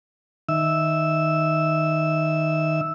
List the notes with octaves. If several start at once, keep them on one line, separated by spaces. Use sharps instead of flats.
D#3 E5 E6